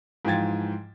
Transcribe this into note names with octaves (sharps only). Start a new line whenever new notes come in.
G#2 E3 F3 G5 G#6 A6